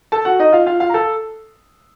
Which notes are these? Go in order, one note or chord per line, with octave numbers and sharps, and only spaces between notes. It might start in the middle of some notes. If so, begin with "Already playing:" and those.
A4 A5
F#4 F#5
D#4 D#5
F4 F5
F4 F5
F4 F5
A#5
A4 A5